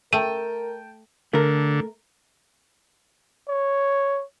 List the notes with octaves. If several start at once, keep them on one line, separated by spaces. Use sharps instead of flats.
A3 A#4 G5 A5 D#7
D3 A3 A#4
C#5